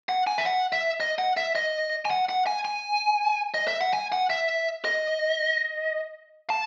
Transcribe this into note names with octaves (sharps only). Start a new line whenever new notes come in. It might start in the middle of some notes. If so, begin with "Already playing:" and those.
F#5
G#5
E5
F#5
E5
D#5
F#5
E5
D#5
G#5
F#5
F#5
G#5
G#5
D#5
E5
F#5
G#5
F#5
E5
D#5
A5